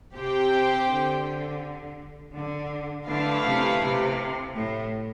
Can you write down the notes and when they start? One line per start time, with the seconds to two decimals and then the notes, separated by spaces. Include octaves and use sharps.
0.16 C3 C4 G4 C5 G5
0.89 D3
2.35 D3
3.08 D3 A3 E4 B4 F5
3.46 C3
3.82 C3
4.56 A2